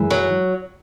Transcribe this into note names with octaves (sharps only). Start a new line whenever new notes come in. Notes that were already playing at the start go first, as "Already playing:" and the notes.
Already playing: F#2 E3 G#3
F#3